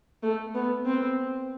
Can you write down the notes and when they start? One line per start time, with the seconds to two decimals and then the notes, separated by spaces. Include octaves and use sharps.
0.23 A3
0.54 B3
0.86 C4